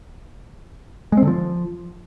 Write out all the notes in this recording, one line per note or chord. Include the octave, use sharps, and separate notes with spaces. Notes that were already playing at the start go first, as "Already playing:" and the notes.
G#3
C4
D3
F3